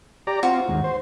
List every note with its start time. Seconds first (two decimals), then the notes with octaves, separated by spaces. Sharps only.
0.27 G4 D5 A#5
0.43 C4 F4 F#4
0.68 D#2 G#2
0.84 C5